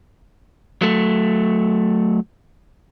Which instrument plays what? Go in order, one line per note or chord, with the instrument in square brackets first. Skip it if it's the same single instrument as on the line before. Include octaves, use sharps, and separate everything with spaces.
[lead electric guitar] F#3 A3